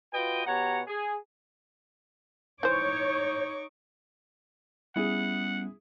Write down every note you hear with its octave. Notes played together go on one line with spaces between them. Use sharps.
F4 F#4 B4 D#5 G5
B2 G4 C#5 F#5 A#5
G#4
E3 D#4 C5 C#5 C#6 D6 G6
G3 B3 C#4 E4 G#4 F#5